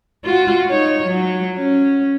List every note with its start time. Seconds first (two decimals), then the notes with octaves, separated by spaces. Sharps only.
0.25 F4 F#4
0.69 D#4 C#5
1.07 F#3
1.57 C#4